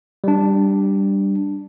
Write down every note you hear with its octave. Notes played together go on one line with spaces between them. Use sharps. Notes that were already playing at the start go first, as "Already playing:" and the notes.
G3 D4